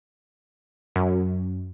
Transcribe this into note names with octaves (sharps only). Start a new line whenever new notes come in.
F#2